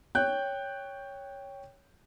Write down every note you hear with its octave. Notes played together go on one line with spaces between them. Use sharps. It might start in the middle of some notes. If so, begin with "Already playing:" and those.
C#5 G5 F#6 G6